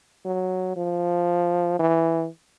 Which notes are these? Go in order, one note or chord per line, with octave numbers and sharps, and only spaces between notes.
F#3
F3
E3